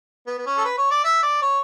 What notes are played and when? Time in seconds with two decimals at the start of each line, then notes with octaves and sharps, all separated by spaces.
0.27 B3
0.38 B3
0.46 C#4
0.57 A4
0.65 B4
0.78 C#5
0.91 D5
1.04 E5
1.23 D5
1.42 C#5